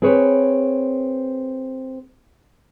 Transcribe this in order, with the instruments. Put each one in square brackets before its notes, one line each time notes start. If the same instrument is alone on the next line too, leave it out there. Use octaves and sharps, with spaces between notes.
[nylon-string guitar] C4 G#4 B4 C#5